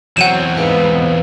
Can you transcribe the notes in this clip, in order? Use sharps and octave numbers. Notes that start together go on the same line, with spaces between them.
E2 F#3 C4 F#5 D#7 E7
G#2 B3 B4 F5